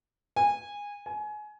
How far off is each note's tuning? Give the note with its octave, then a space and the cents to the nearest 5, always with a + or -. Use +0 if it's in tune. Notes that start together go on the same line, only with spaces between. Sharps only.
G#5 -20
G#5 +25